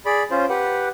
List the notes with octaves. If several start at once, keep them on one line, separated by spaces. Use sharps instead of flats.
G#4 D5 B5
C#4 F4 C5
G4 B4 F#5